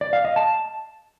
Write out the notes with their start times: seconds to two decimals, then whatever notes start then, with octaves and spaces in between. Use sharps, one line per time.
0.01 D5
0.13 F5
0.25 D#5
0.36 A5